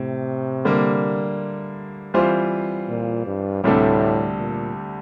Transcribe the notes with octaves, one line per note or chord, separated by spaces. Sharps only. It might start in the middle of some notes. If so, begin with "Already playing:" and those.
Already playing: A2 C3
D3 G3 A#3
E3 G3 C4 F4 C5
A#2
G2
D2 A2 C3 G3 D4 A4
A#2